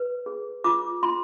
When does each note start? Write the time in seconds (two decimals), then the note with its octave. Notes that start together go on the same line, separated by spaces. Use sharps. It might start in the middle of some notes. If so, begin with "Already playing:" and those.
Already playing: B4
0.26 G#4
0.64 F4 D6
1.03 F4 C6